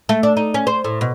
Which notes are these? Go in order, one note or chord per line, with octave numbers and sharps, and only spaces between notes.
A3
D4
D#4
C#4
C5
A2
B2